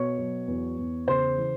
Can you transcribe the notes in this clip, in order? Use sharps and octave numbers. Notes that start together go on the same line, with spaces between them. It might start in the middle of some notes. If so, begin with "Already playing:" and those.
Already playing: B2 C#5 C#6
F#3
E2
E2
C#3 C5 C6
E3